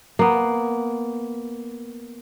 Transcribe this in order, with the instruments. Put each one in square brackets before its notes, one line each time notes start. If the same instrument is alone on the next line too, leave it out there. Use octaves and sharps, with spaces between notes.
[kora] A#3 B3